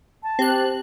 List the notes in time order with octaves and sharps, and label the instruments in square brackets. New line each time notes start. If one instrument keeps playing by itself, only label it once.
[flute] A5
[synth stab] C4 F#6 [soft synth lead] G4